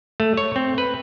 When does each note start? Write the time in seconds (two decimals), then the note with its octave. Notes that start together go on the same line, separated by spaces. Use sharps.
0.20 A3
0.37 C#5
0.56 C4
0.78 B4